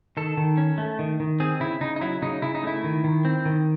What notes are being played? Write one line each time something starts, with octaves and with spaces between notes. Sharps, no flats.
D#3 A4
D#3
C#4
A3
D#3
D#3
C4 G#4
C#3 E4
C#3 D#4
D#4
F#3 E4
C#3 D#4
C#3 E4
D#4
A3 E4
D#3
D#3
C4
D#3